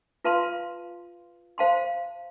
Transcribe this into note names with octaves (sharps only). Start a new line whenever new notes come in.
F4 B4 F5 A5 C6
C5 F5 A5 C6